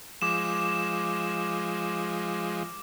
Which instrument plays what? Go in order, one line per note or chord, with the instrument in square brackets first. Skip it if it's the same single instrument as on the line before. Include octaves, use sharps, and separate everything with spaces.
[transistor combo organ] F3 G#3 [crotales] D6 E7